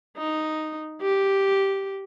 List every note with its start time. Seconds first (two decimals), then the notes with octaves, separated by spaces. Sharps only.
0.17 D#4
1.01 G4